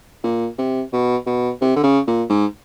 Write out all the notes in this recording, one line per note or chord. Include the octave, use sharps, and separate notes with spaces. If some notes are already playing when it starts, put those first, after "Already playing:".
A#2
C3
B2
B2
C3
D3
C#3
A#2
G#2